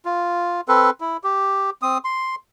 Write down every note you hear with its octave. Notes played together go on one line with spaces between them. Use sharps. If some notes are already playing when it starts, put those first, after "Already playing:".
F4
C4 A4 B4
E4
G4
C4 D#6
C6